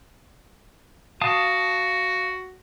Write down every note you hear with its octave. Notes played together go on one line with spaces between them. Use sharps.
F#4 F5 A5 D#6